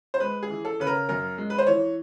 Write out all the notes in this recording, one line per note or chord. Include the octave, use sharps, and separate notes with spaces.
C5
G#3 B4
G#4
E3
A4
C#3 B4
A#4
F#2 A#4
G#3
B4
C5
E3 C#5